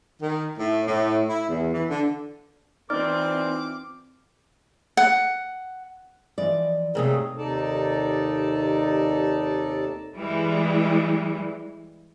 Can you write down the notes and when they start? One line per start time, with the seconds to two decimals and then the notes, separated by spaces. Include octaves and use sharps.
0.21 D#3
0.59 A2
0.87 A2
1.29 E4
1.49 E2
1.74 E3
1.90 D3
2.90 E3 C4 D#4 F4 D5 D6 F6
4.97 F#5
6.38 E3 F3 D5 D#5
6.95 G#2 C3 A3 G#4 A#4 C#5 F5
7.38 D#2 C3 D#4 A4 D5 A5
10.17 E3 G3 G#3